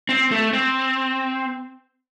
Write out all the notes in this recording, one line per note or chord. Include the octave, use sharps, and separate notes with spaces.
C4
A3
C4